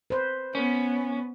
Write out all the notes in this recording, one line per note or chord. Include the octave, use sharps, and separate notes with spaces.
B4 C5
B3 C#4